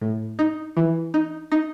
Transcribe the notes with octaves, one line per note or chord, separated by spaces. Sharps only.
A2
D#4
E3
D#4
D#4